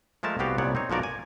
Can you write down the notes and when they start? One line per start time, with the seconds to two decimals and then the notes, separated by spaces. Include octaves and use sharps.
0.23 F3 G#3 A3 A#4 A5
0.39 C2 B3 F#4 G4 F5
0.58 C2 A#2 B3 C#5 D5 F#5
0.75 C4 D#4 C#5
0.90 B1 F3 F#4 A#4 D5
1.03 G#5